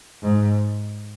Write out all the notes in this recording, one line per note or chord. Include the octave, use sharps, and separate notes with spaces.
G#2